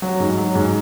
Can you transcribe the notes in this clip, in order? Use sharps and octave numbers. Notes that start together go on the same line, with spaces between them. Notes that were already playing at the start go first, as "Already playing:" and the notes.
F#3
G#2
F#3
G#2